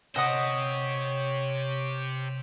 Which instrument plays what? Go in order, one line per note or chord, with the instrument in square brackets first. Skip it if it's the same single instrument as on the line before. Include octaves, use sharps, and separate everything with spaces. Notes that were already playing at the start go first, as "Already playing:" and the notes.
[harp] C3 [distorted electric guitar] G4 C5 [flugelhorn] C#5 [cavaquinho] D#5 F#5 D#6